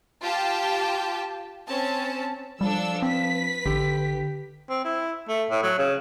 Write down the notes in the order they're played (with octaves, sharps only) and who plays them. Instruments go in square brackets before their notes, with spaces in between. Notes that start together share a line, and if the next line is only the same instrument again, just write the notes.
[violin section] F4 G4 G5 A5
C4 C#4 A5
[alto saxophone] F3 [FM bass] G3 [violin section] D4 A4 E6
[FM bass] C4 [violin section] B4 B6
[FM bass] A1 [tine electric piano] D3 [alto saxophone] G4
[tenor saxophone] C4
E4
A3
A2
F#3
C#3